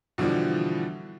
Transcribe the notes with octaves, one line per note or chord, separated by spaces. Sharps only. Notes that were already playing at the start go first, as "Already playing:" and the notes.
B2 D3 E3 F3 G3